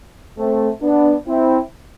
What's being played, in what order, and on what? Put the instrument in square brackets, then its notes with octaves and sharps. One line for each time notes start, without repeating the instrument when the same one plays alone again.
[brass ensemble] A3 C4
B3 D4
C4 E4